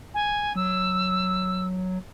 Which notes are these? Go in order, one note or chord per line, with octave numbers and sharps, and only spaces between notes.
G#5
F#3 E6